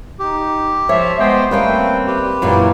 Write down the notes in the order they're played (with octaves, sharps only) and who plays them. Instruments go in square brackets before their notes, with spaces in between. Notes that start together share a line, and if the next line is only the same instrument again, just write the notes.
[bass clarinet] D#4 [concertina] G4
[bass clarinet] F3 [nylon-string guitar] C#5 [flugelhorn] E5
[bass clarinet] G#3 [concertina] B3 G5 [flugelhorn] C5
[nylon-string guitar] G3 A#3 C#4 [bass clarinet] A3 [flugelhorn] C4 [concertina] B4 G5
[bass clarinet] G4 [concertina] B4
[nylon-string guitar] F#2 A#2 E3 [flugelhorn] G3